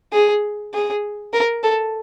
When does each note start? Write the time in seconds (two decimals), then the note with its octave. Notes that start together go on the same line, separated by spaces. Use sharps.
0.13 G#4
0.74 G#4
1.33 A#4
1.63 A4